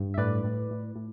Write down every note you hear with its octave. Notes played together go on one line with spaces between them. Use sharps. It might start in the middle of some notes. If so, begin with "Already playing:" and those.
Already playing: G2
E5
A2 B4 D5
A2
A2
A2